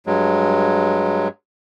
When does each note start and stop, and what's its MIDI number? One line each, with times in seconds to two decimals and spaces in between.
0.07 1.28 43
0.07 1.28 54
0.07 1.28 56